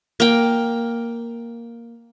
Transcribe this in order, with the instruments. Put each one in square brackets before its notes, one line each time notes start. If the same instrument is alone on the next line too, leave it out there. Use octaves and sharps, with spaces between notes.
[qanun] A#3 G5